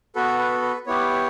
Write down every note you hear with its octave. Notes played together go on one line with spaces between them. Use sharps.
B3 F#4 A4 B4
B4
B4
B3 E4 G4 C#5